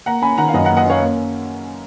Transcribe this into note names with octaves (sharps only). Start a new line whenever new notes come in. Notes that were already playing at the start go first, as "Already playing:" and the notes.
A#3 F#5 A#5
C#4 G#5 B5
D#3 F#5 A#5
F5
F#2 D#5 F#5
A#3 F#5 A#5
D#5 F#5
C#4 C#5 F5
A#3